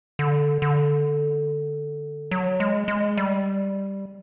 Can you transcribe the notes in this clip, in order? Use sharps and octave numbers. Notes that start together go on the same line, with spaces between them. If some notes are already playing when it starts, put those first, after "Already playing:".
D3
D3
F#3
G#3
G#3
G3